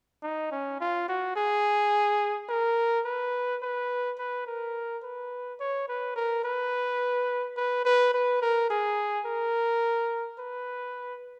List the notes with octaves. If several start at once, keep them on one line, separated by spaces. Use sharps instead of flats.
D#4
C#4
F4
F#4
G#4
A#4
B4
B4
B4
A#4
B4
C#5
B4
A#4
B4
B4
B4
B4
A#4
G#4
A#4
B4